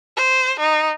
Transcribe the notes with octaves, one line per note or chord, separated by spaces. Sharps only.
C5
D#4